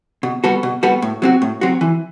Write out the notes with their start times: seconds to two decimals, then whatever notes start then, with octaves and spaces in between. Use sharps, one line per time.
0.23 B2
0.44 G3 B3 F#4 A4
0.63 B2
0.83 G3 B3 F#4 A4
1.02 A2
1.22 F#3 C4 F#4
1.42 A2
1.61 F#3 C4 F#4
1.81 E3